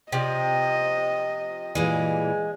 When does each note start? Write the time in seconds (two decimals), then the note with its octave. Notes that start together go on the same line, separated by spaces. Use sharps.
0.12 C3 F3 D#5
1.75 A#2 E3 G3 G#3